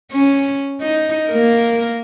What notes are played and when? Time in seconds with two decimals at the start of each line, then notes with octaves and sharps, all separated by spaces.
0.12 C#4
0.81 D#4
1.28 A#3 A#4